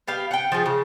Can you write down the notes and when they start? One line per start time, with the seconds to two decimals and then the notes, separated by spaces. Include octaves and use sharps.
0.08 B3 G4 F5
0.31 F#5 G5
0.52 F3 F4 G#4
0.66 C#3